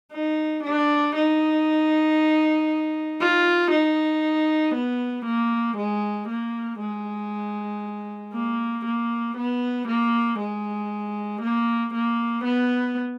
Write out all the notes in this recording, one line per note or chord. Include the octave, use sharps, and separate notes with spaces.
D#4
D4
D#4
F4
D#4
B3
A#3
G#3
A#3
G#3
A#3
A#3
B3
A#3
G#3
A#3
A#3
B3